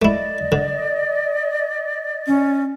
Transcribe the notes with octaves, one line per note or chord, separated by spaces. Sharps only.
A3 E4 D5 D#5
D3
C#4